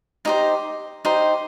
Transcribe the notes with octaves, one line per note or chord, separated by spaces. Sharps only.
D#4 G4 C5 A#5
D#4 G4 C5